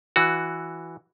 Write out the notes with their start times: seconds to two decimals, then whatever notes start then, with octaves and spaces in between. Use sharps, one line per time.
0.16 E3 F#4